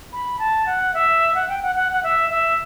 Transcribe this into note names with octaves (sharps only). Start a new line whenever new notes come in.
B5
A5
F#5
E5
F#5
G5
F#5
F#5
F#5
E5
E5